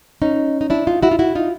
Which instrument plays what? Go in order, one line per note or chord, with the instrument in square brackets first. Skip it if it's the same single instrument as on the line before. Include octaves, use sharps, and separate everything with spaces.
[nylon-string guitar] C#4 D#4
D#4
D4 E4
D#4 F4
E4 F#4
F4
E4 F#4
D#4 F4